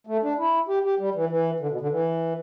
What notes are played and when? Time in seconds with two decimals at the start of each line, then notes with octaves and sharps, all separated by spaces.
0.07 A3
0.23 D4
0.38 E4
0.68 G4
0.84 G4
0.99 G3
1.15 E3
1.29 E3
1.60 D3
1.71 B2
1.80 D3
1.91 E3